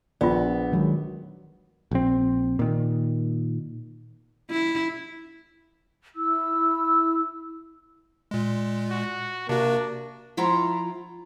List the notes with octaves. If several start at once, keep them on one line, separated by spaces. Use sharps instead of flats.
A#1 B3 F4 D5
D#3 F#3 G#3
A#1 C4
A#2 D#3
E4
E4 E6
A#2 G#3
F#4
C3 A#3 D4 F#4
F3 E4 F4 F#5 A#5